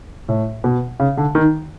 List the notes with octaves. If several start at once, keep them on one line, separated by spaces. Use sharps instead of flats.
A2
B2
C#3
D3
D#3